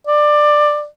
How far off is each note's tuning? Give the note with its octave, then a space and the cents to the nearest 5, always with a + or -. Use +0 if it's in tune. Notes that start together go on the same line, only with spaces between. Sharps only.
D5 +15